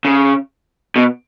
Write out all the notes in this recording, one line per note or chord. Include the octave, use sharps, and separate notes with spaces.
C#3
B2